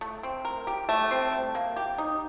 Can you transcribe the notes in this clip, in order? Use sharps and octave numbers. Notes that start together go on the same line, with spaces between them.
A3
C4
A#4
G4
A3
C4
G3
A#3
G4
D#4